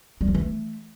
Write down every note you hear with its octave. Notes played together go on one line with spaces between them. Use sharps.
G3
F3
E3
A3